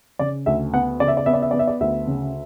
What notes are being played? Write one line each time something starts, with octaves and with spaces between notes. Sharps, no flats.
C#3 D5
D2 E5
B3 F#5
C#3 D5
E5
D5
B3 E5
D5
E5
B3 D5
E5
D5
D2 E5
C#3